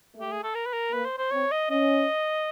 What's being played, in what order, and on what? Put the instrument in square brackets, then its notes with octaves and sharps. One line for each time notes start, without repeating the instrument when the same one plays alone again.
[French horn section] A3
[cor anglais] G4
G#4
A4
A#4
B4
A#4
[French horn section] A#3 [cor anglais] B4
[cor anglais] C5
C5
[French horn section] C4 [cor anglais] C#5
[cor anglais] D#5
[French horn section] C#4 [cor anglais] D#5